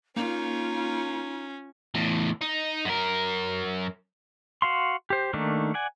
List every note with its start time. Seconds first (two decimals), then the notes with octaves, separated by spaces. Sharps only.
0.16 A#3 C#4 D#4 F4
1.95 E2 A2
2.41 D#4
2.85 F#2 A#4
4.62 F#4 F5 C6
5.10 G4 C5
5.33 D#3 A3 A#3 D4 D#4
5.74 D5 F#5 G#5